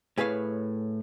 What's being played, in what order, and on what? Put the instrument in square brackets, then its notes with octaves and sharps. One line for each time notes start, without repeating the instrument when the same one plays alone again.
[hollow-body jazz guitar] A2 G#4 B4 C#5 F5